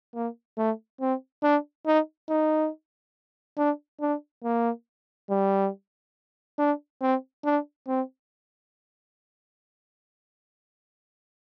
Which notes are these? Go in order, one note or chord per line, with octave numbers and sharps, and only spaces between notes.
A#3
A3
C4
D4
D#4
D#4
D4
D4
A#3
G3
D4
C4
D4
C4